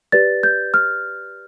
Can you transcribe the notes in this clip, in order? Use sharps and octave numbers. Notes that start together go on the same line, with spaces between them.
G4 B4 D5 A6
G6
F6